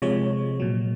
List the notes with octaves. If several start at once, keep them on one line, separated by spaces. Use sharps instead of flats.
C3 F3 G#3 C#5
A#2 F#3